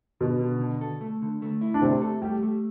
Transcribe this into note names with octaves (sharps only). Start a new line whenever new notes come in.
B2 D3 B3
D3
D3
A4
A3
D3
A3
E4
D4
C3 A3 C4
A4
G3 A3 G4
A3